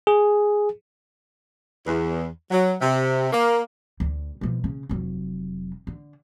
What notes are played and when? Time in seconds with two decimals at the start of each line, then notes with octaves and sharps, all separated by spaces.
0.07 G#4
1.86 E2
2.51 F#3
2.81 C3
3.32 A#3
4.00 D2
4.41 B2 F3
4.64 C#3
4.89 F1 F#3
5.87 D3